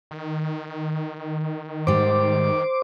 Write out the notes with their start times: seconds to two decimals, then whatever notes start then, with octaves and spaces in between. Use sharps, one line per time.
0.11 D#3
1.87 G#2 G3 C5 D6